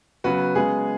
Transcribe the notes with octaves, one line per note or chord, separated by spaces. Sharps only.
C#3 F#3 B3 F#4 B4
C#3 G#3 B3 G#4